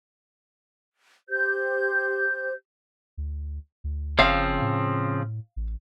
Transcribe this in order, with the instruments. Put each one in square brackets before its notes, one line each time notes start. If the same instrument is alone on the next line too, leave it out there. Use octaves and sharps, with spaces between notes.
[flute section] G4 C5 G6
[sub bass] D2
D2
[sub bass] F#1 [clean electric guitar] C#3 F3 C4 [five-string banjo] F5
[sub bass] A2
A1